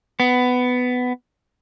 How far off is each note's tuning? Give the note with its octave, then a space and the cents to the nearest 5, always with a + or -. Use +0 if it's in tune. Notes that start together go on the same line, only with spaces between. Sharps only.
B3 +15